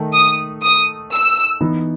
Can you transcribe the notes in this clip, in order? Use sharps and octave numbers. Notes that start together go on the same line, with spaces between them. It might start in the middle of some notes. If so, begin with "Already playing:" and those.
Already playing: D#3 A3 D#4
D#6
D#6
E6
E3 B3 D#4